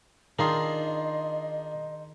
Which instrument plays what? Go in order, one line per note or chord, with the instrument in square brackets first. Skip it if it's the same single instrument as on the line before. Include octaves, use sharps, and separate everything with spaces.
[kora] D#3 [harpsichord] D4 F4 G#4 [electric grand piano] D#4 A#5 C6 [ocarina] D#5